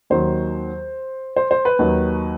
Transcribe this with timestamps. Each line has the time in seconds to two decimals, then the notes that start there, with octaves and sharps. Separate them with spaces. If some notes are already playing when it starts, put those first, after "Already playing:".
0.10 D#2 D#3 F#3 C5
1.36 C5
1.51 C5
1.65 B4
1.79 D#2 D#3 F#3